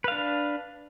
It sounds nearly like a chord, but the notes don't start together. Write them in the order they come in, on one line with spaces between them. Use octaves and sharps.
B4 F5 D4